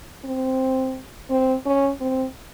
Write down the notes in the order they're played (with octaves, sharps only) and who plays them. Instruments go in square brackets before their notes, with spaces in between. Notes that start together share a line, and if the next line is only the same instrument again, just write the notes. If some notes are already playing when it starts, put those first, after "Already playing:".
[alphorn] C4
C4
C#4
C4